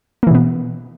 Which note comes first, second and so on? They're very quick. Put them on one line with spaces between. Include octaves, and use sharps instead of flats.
A#3 E3 B2 B3